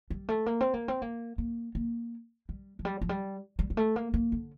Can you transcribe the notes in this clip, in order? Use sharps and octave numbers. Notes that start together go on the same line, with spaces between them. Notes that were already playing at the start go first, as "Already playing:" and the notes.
G3
A3
A#3
C4
A#3
C4
A#3
A#3
A#3
G3
F3
G3
F3
G3
G3
G3
A3
A#3
A#3
D3